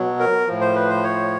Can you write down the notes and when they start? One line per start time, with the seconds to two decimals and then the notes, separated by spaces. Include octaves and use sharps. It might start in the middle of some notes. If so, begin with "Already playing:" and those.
Already playing: B2 F#3
0.19 A#4
0.47 A2 F3
0.61 C5
0.75 B4
0.90 C5
1.03 C#5